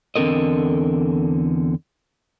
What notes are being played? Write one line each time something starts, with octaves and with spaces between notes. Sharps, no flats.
E2 D3 C4 A4 A#4 D#5